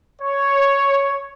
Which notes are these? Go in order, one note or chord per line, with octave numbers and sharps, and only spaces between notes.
C#5